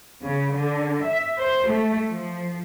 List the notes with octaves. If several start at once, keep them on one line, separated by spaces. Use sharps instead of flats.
C#3
D3
E5
C5
A3
F3